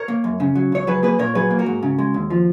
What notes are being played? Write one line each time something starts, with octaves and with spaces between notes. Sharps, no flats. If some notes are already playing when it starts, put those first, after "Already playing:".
Already playing: A#4 C#5
A#3
F#2
C#3
F#3
C#2 C#5
F#3 G#4 B4
A#3 G#4 B4
A#2 A#4 C#5
F#3 G#4 B4
A#3
F#4 A#4
G#2
C#3
G#3
D#2
F3